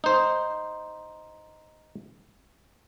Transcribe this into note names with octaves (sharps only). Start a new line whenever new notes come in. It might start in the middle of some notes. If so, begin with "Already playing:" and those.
D#4 C5